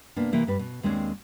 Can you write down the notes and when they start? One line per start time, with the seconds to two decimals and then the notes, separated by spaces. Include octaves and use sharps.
0.16 C3 A#3 B3 D4
0.33 C3 E3 A#3
0.47 G2 G3 B4
0.59 B2
0.83 D#2 G#3 C4 D4 C#5